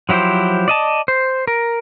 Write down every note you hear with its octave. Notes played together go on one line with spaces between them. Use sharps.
F3 F#3 E4 G4 C5
D5 D#5 A5
C5
A#4